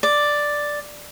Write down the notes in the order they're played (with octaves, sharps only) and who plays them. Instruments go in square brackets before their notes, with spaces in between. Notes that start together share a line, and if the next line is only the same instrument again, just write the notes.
[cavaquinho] D5